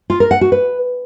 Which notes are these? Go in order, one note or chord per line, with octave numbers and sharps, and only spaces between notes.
F4
A#4
F#5
F#4
B4